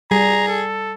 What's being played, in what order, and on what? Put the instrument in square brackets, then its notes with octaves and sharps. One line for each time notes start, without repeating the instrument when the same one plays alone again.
[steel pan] G3 [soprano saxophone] G#4 [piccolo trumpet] A#5
[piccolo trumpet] A4